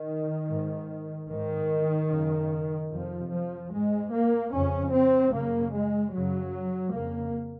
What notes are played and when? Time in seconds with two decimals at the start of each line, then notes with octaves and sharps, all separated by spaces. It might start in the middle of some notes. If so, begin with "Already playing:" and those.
Already playing: D#3
0.50 G#2
1.30 G#2 D#3
2.11 F#2 C#3
2.91 F2 C3 F3
3.31 F3
3.71 G#2 G#3
4.12 A#3
4.52 F2 C#3 C#4
4.92 C4
5.33 F#2 C#3 A#3
5.74 G#3
6.13 F#2 C#3 F#3
6.93 F2 C#3 A#3